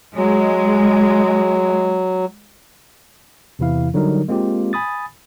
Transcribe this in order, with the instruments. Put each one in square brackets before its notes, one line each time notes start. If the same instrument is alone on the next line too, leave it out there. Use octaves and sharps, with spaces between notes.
[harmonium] F#3 [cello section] G#3
[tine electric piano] E2 C3 E3 E4 F5
D3 F#3 G3 D#4 A#4
G#3 A#3 C4 F4 G4
G#5 B5 D#6 A6